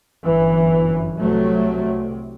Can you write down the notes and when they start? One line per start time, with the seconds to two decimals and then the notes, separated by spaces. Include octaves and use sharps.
0.25 G1 F#2 E3
1.19 C2 C3 F#3 A3